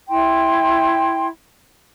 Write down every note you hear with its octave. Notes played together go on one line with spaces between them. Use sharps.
E4 G5 C6